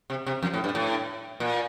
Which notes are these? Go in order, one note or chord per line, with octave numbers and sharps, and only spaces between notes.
C3
C3
F2
A2
G2
A2
A#2